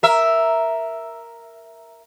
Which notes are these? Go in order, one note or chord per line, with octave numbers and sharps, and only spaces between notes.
A#4 E5